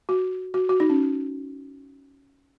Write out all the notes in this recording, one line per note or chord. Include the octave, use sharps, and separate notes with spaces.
F#4
F#4
F#4
D#4
C#4